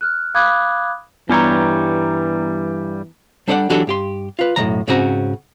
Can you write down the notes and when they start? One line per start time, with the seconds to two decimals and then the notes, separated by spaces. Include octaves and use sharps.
0.01 F6 F#6
0.34 F5 B5 D6 D#6 F#6 G#6
1.30 G2 E3 G3 B3 C#5 A#5
3.48 G3 D4 A4 C5 D5 F#5
3.70 E3 F#3 D4 F#4 G4 A4
3.87 G2 G4 C6
4.39 F4 B4
4.56 B1 F#2 A2 D#3 A#5
4.88 G#2 C#3 C4 C#4 F#4 A#5